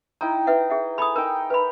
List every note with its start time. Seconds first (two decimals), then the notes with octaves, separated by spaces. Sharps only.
0.21 D#4 E4 G5 A#5
0.47 B4 E5 F#5
0.70 G#4 E5 F#5
0.98 A4 G#5 B5 D#6
1.16 D#4 A#4 G5
1.50 B4 E5 B5